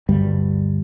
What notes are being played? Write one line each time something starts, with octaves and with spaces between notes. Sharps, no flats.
G1 D2 G2 G3